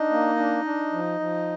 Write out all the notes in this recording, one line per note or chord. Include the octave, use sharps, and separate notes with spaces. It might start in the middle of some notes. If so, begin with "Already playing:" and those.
Already playing: D4 D#4 D#5
A#3
D4
D4
F3
F3